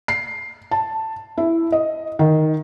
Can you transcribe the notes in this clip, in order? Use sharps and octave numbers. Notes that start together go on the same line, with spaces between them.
C7
A5
E4
D#5
D#3